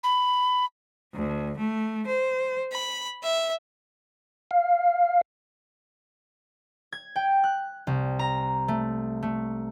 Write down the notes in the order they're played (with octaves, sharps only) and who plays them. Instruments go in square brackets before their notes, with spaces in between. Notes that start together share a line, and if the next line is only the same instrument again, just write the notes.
[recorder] B5
[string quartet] D2
A3
C5
B5
E5
[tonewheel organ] F5
[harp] G#6
G5
F#6
C2
A#5
A3
A3